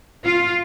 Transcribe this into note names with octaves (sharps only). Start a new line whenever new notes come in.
F4